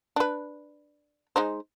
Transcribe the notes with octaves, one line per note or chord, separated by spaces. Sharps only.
D4 B4
G#3 D#4 C5